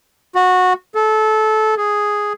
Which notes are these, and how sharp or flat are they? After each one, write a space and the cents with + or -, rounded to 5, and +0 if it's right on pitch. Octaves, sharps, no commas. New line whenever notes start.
F#4 -15
A4 -20
G#4 +0